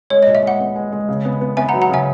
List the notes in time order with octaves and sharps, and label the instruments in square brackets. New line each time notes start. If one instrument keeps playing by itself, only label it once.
[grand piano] G#3 [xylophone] C#5
[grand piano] A#2 [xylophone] D#5
[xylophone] E5
[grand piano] G#3 [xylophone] F#5
[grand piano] B3
G#3
G#3
C#3
B3
B3
[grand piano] B3 [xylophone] E5 G#5
[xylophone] F#5 A#5
[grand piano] F#3
[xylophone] F#5 A#5
[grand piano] C#3 [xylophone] E5 G#5